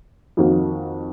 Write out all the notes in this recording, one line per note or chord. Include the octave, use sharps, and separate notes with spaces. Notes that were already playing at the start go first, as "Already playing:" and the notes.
F2 D#3 A#3 D#4 F#4